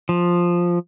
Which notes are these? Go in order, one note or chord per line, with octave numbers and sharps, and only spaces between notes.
F3